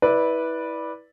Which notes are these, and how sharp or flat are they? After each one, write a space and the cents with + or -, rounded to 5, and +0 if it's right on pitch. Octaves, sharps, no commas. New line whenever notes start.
E4 -20 B4 -10 D5 +0